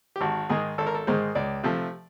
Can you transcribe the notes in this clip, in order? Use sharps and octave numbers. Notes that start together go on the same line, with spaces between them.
G4
G#1 F#4
G#2 D#3 G#3 G#4
G#1 A4
A#4
A4
G#2 D#3 G#3 C5
C#2 D5
C3 F3 A3